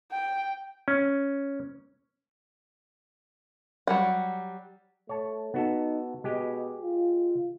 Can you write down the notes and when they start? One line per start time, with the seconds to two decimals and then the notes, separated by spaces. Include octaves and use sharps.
0.12 G5
0.88 C#4
3.87 F#3 G3 F#5
5.09 A3 C#5 A5
5.54 B3 D#4 F#4 A4
6.24 B2 G#3 G4 D#5
6.81 F4